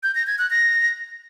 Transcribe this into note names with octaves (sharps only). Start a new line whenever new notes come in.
G6
A#6
G#6
F#6
A#6